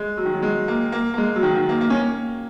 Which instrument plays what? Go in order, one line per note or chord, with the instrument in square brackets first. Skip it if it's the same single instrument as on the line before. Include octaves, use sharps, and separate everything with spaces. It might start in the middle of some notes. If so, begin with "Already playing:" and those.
Already playing: [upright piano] G#3
F#3
D#3
F#3
G#3
A#3
A#3
A#3
G#3
F#3
D#3
D#3
A#3
A#3
C#4
A#3